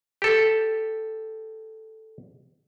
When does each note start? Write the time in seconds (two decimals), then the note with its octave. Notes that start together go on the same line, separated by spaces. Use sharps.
0.22 G4 A4